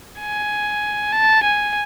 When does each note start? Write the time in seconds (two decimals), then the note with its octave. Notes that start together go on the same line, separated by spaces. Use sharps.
0.20 G#5
1.13 A5
1.43 G#5